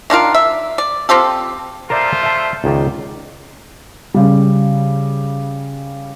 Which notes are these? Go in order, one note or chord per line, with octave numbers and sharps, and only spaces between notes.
D#3 D4 F4 A#4
E5
D5
C4 F4 G4 A4
A3 F4 A#4 C5 D5 E5
E5 A5
C#2 D#3 D5
C#3 G3